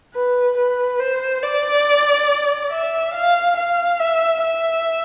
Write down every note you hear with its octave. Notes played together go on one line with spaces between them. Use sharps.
B4
B4
C5
D5
E5
F5
F5
E5
E5